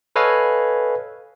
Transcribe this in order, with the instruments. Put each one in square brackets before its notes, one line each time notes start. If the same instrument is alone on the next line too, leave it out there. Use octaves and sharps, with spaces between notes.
[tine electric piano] A4 B4 C#5 D#5 F5 G#5